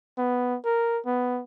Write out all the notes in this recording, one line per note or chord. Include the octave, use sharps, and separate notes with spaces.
B3
A#4
B3